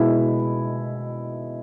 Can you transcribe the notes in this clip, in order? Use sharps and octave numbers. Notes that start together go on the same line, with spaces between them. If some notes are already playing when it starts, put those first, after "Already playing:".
Already playing: B2 G#3 E4